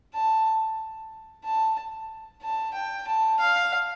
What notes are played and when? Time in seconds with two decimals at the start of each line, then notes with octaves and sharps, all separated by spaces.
0.14 A5
1.44 A5
2.42 A5
2.74 G5
3.07 A5
3.40 F5